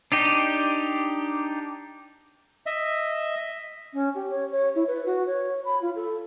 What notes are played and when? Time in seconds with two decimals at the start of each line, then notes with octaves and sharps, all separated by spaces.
0.12 D4 D#4 G4
2.66 D#5 E5
3.94 C#4
4.15 G4
4.30 C#5
4.51 C#5
4.75 E4
4.88 B4
5.06 F#4
5.27 C#5
5.65 B5
5.82 F4
5.96 A4